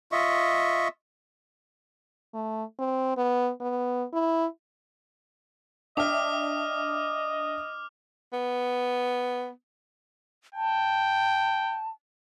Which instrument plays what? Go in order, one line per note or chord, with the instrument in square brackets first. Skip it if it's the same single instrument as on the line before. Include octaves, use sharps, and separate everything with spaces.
[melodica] F4 D#5 E5 C#6
[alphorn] A3
C4
B3
B3
E4
[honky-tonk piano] D4 E5 G5 [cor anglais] D#5 [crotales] D6 F6
[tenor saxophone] B3
[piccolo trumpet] G5 [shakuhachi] A5